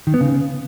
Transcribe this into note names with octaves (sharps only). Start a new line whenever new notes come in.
D#3
B3
C#3